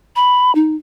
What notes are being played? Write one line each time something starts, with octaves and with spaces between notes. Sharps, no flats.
B5
D#4